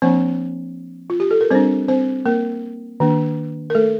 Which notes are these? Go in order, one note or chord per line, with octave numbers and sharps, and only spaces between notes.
F3 A#3 C4 D4 C5
F4
G4
A4
A#4
G3 C4 D4 C5
C4 C5
A#3 A#4
D#3 A#3 D4
A#4
A3 A4